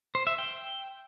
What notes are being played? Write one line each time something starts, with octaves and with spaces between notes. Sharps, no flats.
C5
E5
G5